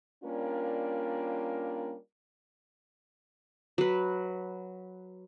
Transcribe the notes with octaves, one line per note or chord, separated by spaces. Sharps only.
G3 A#3 C#4 D4 F4 A#4
F#3 B4